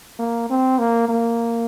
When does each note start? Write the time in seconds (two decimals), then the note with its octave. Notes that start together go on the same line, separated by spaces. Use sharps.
0.19 A#3
0.50 C4
0.79 A#3
1.09 A#3